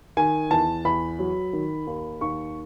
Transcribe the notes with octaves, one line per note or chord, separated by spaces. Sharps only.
D#3 G#5
E2 A5
E2 B5
F#3
D#3
D#2
D#2 C#6